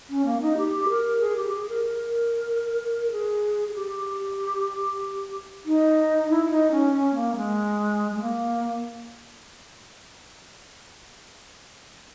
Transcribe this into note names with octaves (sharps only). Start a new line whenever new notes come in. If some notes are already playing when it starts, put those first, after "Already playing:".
C#4
A#3
D#4
G4
A#4
G#4
G4
G#4
A#4
A#4
G#4
G#4
G4
D#4
E4
E4
D#4
C#4
C#4
A#3
G#3
G#3
A#3